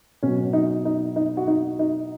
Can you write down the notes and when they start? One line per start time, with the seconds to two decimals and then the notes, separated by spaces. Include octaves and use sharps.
0.23 B2 F#3 C#4
0.53 D#4
0.85 D#4
1.16 D#4
1.37 F#4
1.47 D#4
1.79 D#4